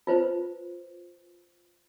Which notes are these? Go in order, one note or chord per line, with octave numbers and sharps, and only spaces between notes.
F4 B4 C5